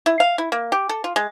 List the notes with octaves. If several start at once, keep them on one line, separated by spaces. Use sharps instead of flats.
E4
F5
E4
A#3
G4
A4
F4
G#3